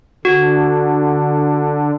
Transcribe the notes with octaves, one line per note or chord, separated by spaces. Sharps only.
D3 F#4